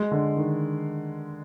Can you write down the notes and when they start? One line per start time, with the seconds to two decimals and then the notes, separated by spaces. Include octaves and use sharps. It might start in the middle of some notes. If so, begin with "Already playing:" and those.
Already playing: G#3
0.11 D3
0.37 D#3